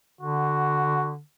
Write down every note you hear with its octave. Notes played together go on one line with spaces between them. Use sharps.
D3 F#4